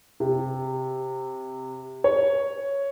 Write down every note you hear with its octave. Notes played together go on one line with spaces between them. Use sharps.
C3
C#5